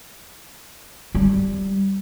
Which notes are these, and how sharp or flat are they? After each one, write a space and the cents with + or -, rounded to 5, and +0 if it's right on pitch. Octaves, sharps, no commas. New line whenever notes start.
G3 -5